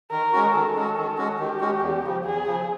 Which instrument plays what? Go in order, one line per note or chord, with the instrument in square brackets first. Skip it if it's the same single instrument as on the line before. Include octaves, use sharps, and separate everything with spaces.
[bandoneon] D#3 [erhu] A#4
[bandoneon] G#3 C#4 F#4
[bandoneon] D#3 [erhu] A4
[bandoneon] G#3 C#4 F#4
D#3
G#3 C#4 F#4
[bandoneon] D#3 [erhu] G4
[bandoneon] G#3 C#4 F#4
E2
C#3 F3
[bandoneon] E2 [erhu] G#4
[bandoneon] C#3 F3